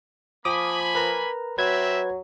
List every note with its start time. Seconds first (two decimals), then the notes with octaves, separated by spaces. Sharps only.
0.45 F3 A#3 G#5 B5 D6 D#6
0.95 A#4 B4 A#5
1.58 F#3 C4 B4 E5 G#6